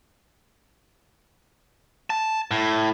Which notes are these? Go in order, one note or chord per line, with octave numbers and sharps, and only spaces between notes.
A5
A2